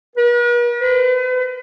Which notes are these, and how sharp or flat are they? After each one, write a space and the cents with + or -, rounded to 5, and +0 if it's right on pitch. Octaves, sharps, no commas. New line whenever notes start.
B4 -45
B4 +40